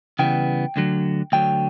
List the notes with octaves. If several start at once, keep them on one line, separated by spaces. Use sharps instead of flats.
C#3 E3 G3 B3 G5
D2 D3 F#3
D2 D3 F#3 G5